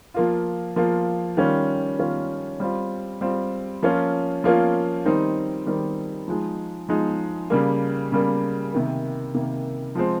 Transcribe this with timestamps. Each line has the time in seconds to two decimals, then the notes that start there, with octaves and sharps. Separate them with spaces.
0.14 F3 A#3 F4
0.76 F3 A#3 F4
1.37 D#3 G3 C#4 F4
1.99 D#3 G3 C#4 F4
2.60 G3 C4 F4
3.21 G3 C4 F4
3.83 F3 A#3 C#4 F4
4.44 F3 A#3 C#4 F4
5.05 D#3 G3 C4 D#4
5.66 D#3 G3 C4 D#4
6.28 F3 G#3 D#4
6.89 F3 G#3 D#4
7.50 C#3 G3 A#3
8.12 C#3 G3 A#3
8.73 C3 D#3 A#3
9.34 C3 D#3 A#3
9.95 F3 G#3 C4